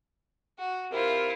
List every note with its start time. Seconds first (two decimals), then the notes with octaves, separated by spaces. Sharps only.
0.58 F#4
0.92 C3 C4 E4 F4 A#4